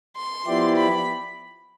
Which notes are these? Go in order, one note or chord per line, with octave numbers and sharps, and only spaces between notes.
C6
F3 B3 E4 G4 D5
B5